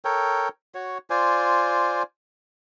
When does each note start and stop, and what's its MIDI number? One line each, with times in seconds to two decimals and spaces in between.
0.05 0.49 69
0.05 0.49 70
0.05 0.49 73
0.05 0.49 79
0.75 0.98 66
0.75 0.98 73
1.10 2.03 65
1.10 2.03 72
1.10 2.03 74
1.10 2.03 80